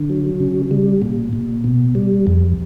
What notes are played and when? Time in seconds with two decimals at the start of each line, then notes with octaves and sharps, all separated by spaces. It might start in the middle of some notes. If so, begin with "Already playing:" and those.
Already playing: D3
0.10 F#3
0.40 C#3
0.71 G3
1.02 A#2
1.33 A#2
1.64 B2
1.95 G3
2.27 F2